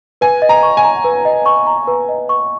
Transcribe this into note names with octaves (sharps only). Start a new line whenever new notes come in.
B4 G#5
D#5
A#5
C#6
G#5
A#5
B4
D#5
C#6
A#5
B4
D#5
C#6